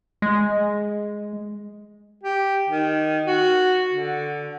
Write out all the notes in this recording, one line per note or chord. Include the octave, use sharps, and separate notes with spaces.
G#3
G4
D#3
F#4
D3